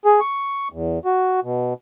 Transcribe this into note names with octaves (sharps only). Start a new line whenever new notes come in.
G#4
C#6
E2
F#4
B2